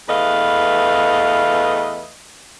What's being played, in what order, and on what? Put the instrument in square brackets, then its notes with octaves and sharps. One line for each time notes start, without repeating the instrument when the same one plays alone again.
[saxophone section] E2 A3 B4 D#5 F5